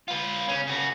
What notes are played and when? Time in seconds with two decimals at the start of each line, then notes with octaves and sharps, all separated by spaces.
0.08 F4 B4
0.48 C#3 C#4
0.67 C#3 F#4